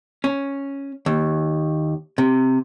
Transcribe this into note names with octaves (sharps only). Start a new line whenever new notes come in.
C#4
D#2
C3